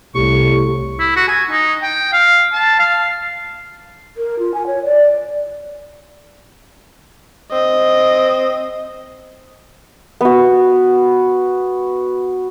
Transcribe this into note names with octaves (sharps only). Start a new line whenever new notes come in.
C2 A2 G4 C#6
E4
F#4
G#5
D#4
G5
F5
A5
F5
A#4
F4
G#5
C#5
D5
C4 D#5
B3 F#4